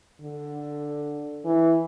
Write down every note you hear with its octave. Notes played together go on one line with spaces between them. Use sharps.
D3
E3